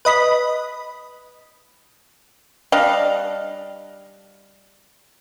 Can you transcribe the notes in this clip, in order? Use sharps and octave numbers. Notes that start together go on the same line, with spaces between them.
B4 D#5 B5
G3 D4 D#5 F5